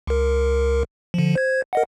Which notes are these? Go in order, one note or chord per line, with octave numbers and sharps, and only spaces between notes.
C#2 A#4
D3 F3
C5 G#6
A#4 D#5 F#5